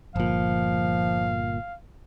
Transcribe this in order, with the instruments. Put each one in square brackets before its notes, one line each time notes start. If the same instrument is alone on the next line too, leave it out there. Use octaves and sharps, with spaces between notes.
[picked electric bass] G1 A#2 [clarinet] F3 [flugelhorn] F5